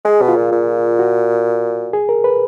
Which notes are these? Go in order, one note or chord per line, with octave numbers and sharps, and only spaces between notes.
G#3 G#4
B2
F4
A#2
A#2
F#4
G#4
A#4
B4